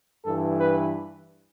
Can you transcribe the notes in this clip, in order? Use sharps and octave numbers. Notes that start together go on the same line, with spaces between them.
G2 E3 A4
B4